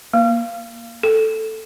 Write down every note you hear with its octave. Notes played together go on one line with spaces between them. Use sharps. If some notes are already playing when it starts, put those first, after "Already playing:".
A#3
A4